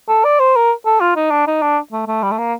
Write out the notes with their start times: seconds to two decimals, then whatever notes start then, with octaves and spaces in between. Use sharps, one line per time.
0.09 A4
0.24 D5
0.39 C5
0.56 A#4
0.86 A4
1.00 F4
1.15 D#4
1.31 D4
1.47 D#4
1.62 D4
1.92 A3
2.07 A3
2.23 G3
2.31 A3
2.38 A#3